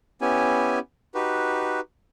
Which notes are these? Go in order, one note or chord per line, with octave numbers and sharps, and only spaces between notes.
B3 C#4 E4 G4 G#5
D#4 F#4 G4 B4